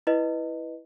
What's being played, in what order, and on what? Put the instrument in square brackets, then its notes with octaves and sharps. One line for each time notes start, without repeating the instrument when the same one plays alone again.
[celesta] E4 B4 D#5